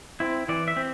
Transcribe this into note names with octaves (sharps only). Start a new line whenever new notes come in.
C4 E4
E3 D5
E5
C4